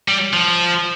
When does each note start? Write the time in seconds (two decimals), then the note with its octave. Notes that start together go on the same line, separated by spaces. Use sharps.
0.08 G3
0.33 F3